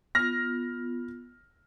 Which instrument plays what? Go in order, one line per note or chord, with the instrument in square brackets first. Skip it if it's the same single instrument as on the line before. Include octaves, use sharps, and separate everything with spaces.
[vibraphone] B3 F4 [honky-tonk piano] F6 A#6